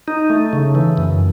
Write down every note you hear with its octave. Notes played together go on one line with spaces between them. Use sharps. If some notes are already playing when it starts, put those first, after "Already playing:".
D#4
A3
C#3
E3
F#2